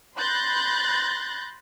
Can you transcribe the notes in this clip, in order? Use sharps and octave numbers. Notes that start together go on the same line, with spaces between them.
B5 C6 F#6 G6 A6 A#6